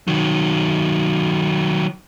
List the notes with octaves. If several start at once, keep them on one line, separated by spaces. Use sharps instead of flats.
D#3 F#3